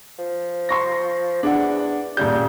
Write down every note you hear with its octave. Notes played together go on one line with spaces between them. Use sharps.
F3
C6 C#6 A#6
E2 D4 F#5
D#1 C#3 G3 G6